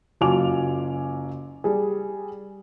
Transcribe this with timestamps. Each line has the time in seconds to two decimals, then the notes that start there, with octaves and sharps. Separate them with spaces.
0.21 F#1 F#3 F4 G#5 D6 F7
1.64 G3 G#4